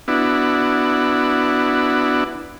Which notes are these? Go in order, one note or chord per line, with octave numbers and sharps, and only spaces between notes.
B3 D4 E4 F#4